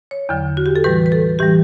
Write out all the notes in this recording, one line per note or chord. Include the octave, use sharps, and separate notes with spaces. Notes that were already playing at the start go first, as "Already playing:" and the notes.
C#5
E2 D3 F#3
F#4
G4
A4
A2 E3 G3 B4
B4
A4
A2 E3 G3 G4